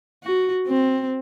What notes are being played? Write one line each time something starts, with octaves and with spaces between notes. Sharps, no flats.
F#4
C4